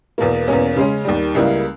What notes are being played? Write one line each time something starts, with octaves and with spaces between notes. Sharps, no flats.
E2 B2 A#3
E2 B2 A#3 C#4
C#3 G#3 C#4
D#2 D#3 G3
C#2 C#3 G3 A#3 E4